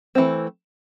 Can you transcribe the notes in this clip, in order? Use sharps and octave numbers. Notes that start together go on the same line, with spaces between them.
E3 A3 C4